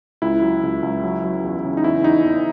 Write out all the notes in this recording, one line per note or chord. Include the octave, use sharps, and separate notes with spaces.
C#2 E4
F#3
C#2
C#2
F#3
F#3
E2
C#3
D#4
E2 E4
E2 D#4
E2